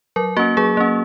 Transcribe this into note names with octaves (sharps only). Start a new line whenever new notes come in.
F#3 A#4
A#3 C#4 F#4
F#3 G#4
A#3 C#4